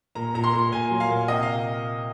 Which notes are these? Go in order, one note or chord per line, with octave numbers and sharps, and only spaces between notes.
A#2 A#5
A#2 A#5
C6
A#2
A#2 G#5
F#3
F5
A#2
C3 D#5
F5